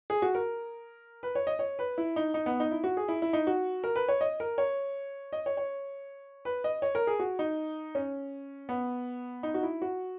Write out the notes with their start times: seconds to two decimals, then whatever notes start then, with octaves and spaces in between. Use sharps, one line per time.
0.10 G#4
0.22 F#4
0.35 A#4
1.23 B4
1.35 C#5
1.47 D#5
1.59 C#5
1.79 B4
1.98 E4
2.16 D#4
2.34 D#4
2.46 B3
2.60 D#4
2.71 E4
2.84 F#4
2.97 G#4
3.08 E4
3.22 E4
3.33 D#4
3.47 F#4
3.84 A#4
3.96 B4
4.08 C#5
4.21 D#5
4.40 A#4
4.58 C#5
5.33 D#5
5.46 C#5
5.57 C#5
6.45 B4
6.64 D#5
6.82 C#5
6.95 A#4
7.07 G#4
7.20 F#4
7.39 D#4
7.95 C#4
8.69 B3
9.43 D#4
9.54 F#4
9.63 E4
9.82 F#4